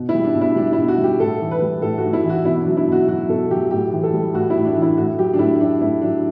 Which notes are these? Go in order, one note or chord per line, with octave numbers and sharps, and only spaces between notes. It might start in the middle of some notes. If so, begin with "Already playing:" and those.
Already playing: B2
E4
G3
D4
B2
E4
G3 D4
E4
B2
F#4
G3
G4
A2 A4
E3
B4
G3
A2 A4
F#4
A2
E4
E3
F#4
B2 E4
D4
F#3
E4
B2 F#4
F#3 F#4
B2 A4
F#3 G4
A2 G4
E3
A4
G3
A2 F#4
E4
A2
D4
E3
E4
A2 F#4
F#3 G4
D4
A2 E4
F#3 D4
A2 E4
F#3 D4